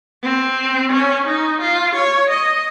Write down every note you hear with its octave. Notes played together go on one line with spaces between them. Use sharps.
C4
C#4
D#4
F4
C#5
D#5